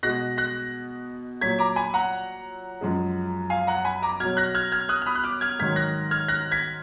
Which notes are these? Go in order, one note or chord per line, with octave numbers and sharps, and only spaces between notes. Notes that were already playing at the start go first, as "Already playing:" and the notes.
B2 G#3 F#6 A#6
F#6 A#6
A#2 F#3 G#6 B6
A#5 D6
G#5 B5
F#5 A#5
F#2 F3 G#3
F5 G#5
F#5 A#5
G#5 B5
A#5 D6
B2 F#3 F6 G#6
F#6 A#6
F6 G#6
F6 G#6
D#6 F#6
F6
B5 D#6
F#6
D6 F6
F6 G#6
G#2 D#3 F#3 G#6 B6
F#6 A#6
F6 G#6
F#6 A#6
G#6 B6